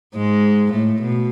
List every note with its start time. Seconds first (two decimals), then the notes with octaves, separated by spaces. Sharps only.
0.15 G#2 G#3
0.72 A2 A3
1.02 B2